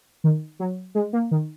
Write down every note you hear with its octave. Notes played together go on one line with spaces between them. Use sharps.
D#3
F#3
G#3
A#3
D#3